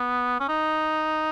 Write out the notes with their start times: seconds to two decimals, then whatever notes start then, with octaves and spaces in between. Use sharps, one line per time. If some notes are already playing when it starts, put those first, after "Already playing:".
Already playing: B3
0.40 C#4
0.48 D#4